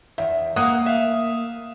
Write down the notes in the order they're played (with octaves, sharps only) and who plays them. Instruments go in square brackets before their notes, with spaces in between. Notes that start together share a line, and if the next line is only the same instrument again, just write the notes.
[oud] E2 [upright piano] E5
[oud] A#3 [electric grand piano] F5 F#5 [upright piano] D#6 F#6
[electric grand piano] E5 F5